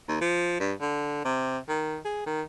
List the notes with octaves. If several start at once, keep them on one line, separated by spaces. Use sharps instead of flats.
D#2
F3
G2
D3
C3
D#3
G#4
D#3